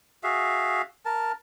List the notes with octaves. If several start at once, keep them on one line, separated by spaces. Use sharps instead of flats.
F#4 G#4 E5 F5
A#4 A5